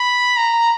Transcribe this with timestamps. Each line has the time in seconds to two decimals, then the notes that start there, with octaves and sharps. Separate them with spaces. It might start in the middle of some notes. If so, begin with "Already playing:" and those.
Already playing: B5
0.37 A#5